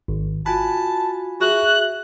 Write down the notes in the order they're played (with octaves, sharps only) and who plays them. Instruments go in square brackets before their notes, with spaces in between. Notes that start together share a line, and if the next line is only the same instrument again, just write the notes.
[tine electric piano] G#1
[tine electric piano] F4 G#5 B5 [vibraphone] F#4 [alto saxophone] A5
[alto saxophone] F#4 [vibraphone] G#4 E5 [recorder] F#6